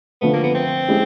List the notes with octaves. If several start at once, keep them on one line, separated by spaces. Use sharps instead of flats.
D3 F3 A3 B3
A#3
B3
C4
G#3 C#4 E4 G4